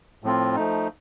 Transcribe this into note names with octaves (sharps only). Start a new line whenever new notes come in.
A2 F3 C4 F4
F3 A3 D#4